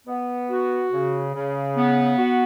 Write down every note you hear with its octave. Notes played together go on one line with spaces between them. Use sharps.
B3
F#4
C#3
C#3
B3
F#4